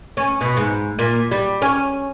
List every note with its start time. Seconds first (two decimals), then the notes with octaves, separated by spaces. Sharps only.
0.17 C#4
0.41 B2
0.57 G#2
0.99 A#2
1.31 G3
1.62 C#4